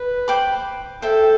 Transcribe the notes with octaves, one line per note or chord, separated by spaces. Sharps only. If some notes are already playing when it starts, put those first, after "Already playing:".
Already playing: B4
C5 G5 B5 D6
A4 C5 E5 G5